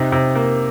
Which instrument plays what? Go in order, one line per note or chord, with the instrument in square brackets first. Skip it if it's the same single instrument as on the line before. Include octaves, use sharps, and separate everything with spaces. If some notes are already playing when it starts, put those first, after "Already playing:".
Already playing: [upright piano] C3 D#4
C3
A#3